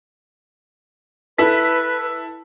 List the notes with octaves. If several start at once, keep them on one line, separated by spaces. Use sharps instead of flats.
E4 A4 B4 B6